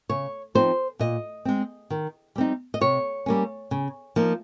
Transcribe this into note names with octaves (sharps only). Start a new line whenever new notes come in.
C#3 C#5
F3 C4 D#4 C5
A#2 D#5
G#3 C4
D#3
G3 C4 D#4
D#5
C3 C#5
G3 A#3 C#4
C#3
F3 A#3 D#4